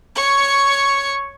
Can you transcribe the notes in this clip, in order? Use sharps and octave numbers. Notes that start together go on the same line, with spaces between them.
C#5 C#6